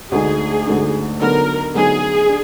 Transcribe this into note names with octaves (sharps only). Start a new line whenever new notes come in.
D2 D3 G#3 D#4 G#4
D2 D3 G#3 D#4
D3 F#3 B3 D#4 A#4
D3 F#3 B3 D#4 G#4
D4